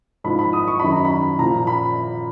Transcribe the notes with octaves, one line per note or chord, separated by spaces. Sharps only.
G#2 F3 B5
B5
D#6
C#6
F#2 D#3 B5
A#5
B5
A#2 F3 A#5
B5